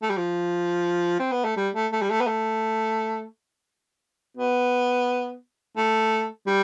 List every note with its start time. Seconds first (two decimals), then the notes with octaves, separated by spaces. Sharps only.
0.02 A3
0.10 G3
0.17 F3
1.19 C4
1.32 B3
1.44 A3
1.57 G3
1.75 A3
1.92 A3
2.02 G3
2.10 A3
2.21 B3
2.27 A3
4.37 B3
5.77 A3
6.47 G3